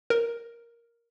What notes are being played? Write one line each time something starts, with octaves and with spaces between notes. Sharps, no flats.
A#4